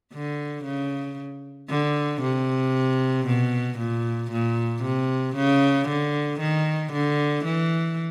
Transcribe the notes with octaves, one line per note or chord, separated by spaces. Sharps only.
D3
C#3
D3
C3
B2
A#2
A#2
C3
C#3
D3
D#3
D3
E3